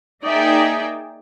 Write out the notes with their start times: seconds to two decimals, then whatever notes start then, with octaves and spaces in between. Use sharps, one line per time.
0.24 A#3 D#4 G#4 D5 E5 G5